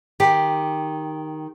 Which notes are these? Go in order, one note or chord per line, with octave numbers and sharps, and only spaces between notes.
D#3 G4